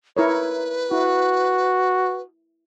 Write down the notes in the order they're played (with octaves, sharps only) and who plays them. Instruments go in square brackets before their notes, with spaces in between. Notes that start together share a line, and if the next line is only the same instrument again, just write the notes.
[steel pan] E4 A#4 C#5 [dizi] B4
[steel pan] E4 [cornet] F#4